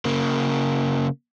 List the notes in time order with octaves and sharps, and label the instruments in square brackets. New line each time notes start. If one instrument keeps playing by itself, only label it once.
[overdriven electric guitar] C#3 A#3